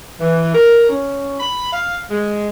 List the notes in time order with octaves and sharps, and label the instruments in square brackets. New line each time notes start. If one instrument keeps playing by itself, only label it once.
[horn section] E3
A#4
C#4
B5
F5
G#3